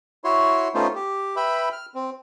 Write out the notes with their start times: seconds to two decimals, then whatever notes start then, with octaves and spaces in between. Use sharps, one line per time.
0.24 E4 F#4 C#5 C6
0.74 A3 B3 C#4 D#4 F4 C5
0.95 G4
1.36 B4 E5 G5 B5
1.72 F6
1.95 C4